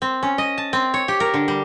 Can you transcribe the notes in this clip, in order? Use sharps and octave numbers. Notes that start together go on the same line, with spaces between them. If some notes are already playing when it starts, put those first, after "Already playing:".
C4
C#4
D#5
A5
C4
C#5
G4
A#4
D3
G3